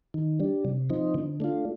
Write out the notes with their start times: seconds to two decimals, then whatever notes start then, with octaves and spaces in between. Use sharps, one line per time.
0.14 D#3
0.40 G3 D4
0.65 C3
0.90 F3 C4 D#4
1.14 D3
1.40 A3 D4 F4